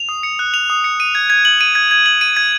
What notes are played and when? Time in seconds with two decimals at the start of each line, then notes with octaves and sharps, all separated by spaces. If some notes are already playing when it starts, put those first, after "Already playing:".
Already playing: F7
0.09 D#6
0.23 C#7
0.39 F#6
0.54 F7
0.70 D#6
0.84 C#7
1.00 D#7
1.15 G#6
1.30 G#6
1.45 F#7
1.61 D#7
1.75 G#6
1.91 G#6
2.06 F#7
2.21 D#7
2.37 G#6